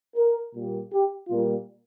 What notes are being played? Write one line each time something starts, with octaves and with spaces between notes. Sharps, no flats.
A#4
A#2 G3 A#3
G4
A#2 G3 A#3 F4